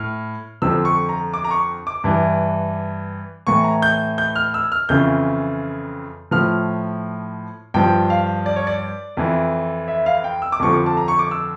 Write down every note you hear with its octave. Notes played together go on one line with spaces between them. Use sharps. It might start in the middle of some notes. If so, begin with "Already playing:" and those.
Already playing: A2 F6
F2 D3 F3 E6
C#6
A#5
D6
A#5
C#6
D6
G2 E3
A2 E3 C#6
A#5
G6
G6
F6
E6
F6
F2 C#3 E3 G6
A2 F3 F6
G2 F3 G5
F5
D5
C#5
D5
F2 E3
E5
F5
G5
E6
D6
F2 D3 F3 C#6
D6
A5
A#5
C#6
D6
E6